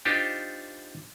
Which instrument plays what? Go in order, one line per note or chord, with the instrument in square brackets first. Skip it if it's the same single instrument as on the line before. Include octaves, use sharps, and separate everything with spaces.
[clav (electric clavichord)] D4 D#4 F4 G4 C5